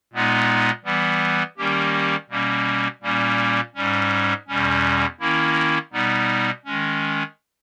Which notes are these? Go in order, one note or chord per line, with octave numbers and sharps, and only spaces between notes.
A#2 G#3 B3 D#4
E3 G3 B3
D#3 G3 A#3 C#4 G4
B2 G3 A#3 C#4
A#2 G3 A#3 C#4
G#2 G3 C#4
E2 B2 G3 C#4
D#3 A#3 C#4 E4
B2 G3 B3 D#4
D#3 G#3 C#4